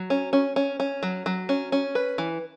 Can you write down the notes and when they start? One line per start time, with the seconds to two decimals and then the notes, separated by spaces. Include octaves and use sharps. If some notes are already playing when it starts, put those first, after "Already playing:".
Already playing: F#3
0.10 C#4
0.33 C#4
0.56 C#4
0.80 C#4
1.03 F#3
1.26 F#3
1.49 C#4
1.72 C#4
1.95 B4
2.18 E3